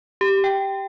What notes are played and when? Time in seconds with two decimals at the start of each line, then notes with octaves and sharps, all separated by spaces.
0.21 G4
0.44 G5